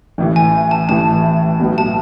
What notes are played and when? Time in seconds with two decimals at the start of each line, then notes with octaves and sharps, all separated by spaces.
0.18 A1 A2 E3
0.36 G#5
0.71 A5
0.89 A1 A2 E3 A5
1.60 B1 A2 F#3 B3
1.78 A5